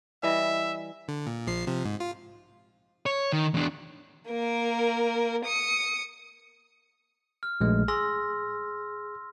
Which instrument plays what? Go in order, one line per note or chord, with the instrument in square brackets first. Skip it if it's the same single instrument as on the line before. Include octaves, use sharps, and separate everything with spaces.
[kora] E3 G3 D#5 [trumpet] E5
[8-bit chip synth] D3
A#2
A#1 F3 C7
C3 F3
G#2
F4
[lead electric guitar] C#5
D#3
E2 D4
[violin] A#3 A#4
D#6 C#7
[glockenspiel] F6
[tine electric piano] A#1 G#3 A3
[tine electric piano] G#4 [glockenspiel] C6 E6 A#6